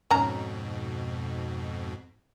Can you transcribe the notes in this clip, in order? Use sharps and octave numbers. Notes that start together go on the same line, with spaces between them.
F2 G#2 B2 C#4 A#5